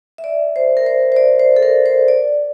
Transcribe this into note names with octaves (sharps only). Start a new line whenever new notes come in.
E5
D5
C5
A#4
C5
C5
D5
C5
A4
A#4
C5
D5